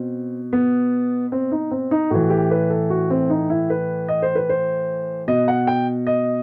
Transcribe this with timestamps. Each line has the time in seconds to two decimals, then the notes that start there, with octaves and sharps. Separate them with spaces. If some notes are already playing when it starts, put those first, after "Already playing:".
Already playing: B2 C4
0.53 B3
1.32 C4
1.52 D#4
1.71 C4
1.91 D#4
2.10 A2 E3 F#4
2.30 G4
2.51 B4
2.70 A4
2.90 F#4
3.10 C4
3.30 D#4
3.50 E4
3.70 B4
4.08 D#5
4.22 C5
4.35 B4
4.49 C5
5.28 B2 D#5
5.48 F#5
5.67 G5
6.07 D#5